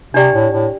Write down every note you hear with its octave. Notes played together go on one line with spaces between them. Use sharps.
C3 D4 G4 D5 G5
A2
A2